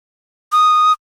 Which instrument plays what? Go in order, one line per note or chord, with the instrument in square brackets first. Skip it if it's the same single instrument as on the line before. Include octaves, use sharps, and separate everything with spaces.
[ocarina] D#6